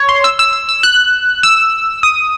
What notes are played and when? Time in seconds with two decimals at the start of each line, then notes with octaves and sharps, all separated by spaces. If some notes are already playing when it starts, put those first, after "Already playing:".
Already playing: C#5
0.09 C6
0.24 E6
0.39 E6
0.53 E6
0.69 E6
0.83 F#6
1.43 E6
2.03 D#6